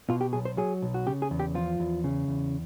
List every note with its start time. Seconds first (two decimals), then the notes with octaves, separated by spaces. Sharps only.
0.09 B2 F4
0.21 G4
0.33 B1 G#4
0.45 C5
0.57 F#3 G#4
0.82 B1
0.94 F#4
1.06 C#3 G4
1.22 G#4
1.31 E2
1.40 G4
1.55 F3 F4
1.80 E2
2.04 C#3
2.28 E2